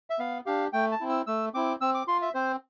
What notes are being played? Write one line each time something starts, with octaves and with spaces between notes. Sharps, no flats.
E5
B3 F5
D4 G4 F5
A3 G5
A5
C4 E4
E6
A3 E6
C4 E4 D6
C4 E6
D6
F4 C6
E5
C4 C5